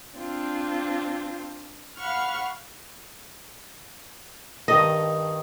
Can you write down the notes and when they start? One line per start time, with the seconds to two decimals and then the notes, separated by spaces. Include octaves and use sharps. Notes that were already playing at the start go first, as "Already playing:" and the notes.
0.17 C4 D4 F4
1.98 F5 F#5 B5 C#6 F6
4.68 G2 D#3 D#5 A5